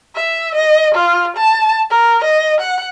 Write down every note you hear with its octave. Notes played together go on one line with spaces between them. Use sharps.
E5
D#5
F4
A5
A#4
D#5
F#5